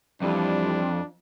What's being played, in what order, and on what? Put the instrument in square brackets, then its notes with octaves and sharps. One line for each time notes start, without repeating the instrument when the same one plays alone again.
[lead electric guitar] F2 [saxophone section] E3 G3 [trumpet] D4